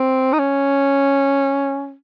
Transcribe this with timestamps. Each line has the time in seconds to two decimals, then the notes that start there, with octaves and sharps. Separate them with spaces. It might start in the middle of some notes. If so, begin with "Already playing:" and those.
Already playing: C4
0.33 D#4
0.39 C#4